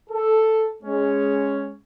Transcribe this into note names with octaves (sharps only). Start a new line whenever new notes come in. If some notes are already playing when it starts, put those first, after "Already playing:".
A4
G#3 C#4